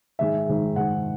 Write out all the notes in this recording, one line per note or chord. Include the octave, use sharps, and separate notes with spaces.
G#2 D#3 G#3 E5
G#2 D#3 G#3
G#2 D#3 G#3 F#5